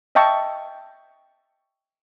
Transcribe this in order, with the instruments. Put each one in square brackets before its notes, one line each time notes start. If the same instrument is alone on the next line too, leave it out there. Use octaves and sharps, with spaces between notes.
[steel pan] D#5 E5 G5 A5 C#6